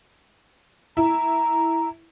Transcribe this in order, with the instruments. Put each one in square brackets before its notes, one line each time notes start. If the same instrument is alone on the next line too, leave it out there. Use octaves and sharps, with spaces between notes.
[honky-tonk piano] E4 [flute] A#5